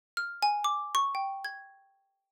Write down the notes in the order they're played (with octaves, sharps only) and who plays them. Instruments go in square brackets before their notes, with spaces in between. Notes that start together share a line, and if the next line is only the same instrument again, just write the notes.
[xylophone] F6
G#5
D6
C#6
G5
G#6